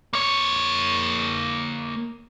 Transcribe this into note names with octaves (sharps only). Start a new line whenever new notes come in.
A#3 C#5